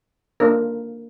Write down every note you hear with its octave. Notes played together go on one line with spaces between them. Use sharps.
A#3 D4 F4 A#4